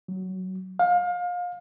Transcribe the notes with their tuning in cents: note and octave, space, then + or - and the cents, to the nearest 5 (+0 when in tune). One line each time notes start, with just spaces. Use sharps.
F#3 +10
F5 +30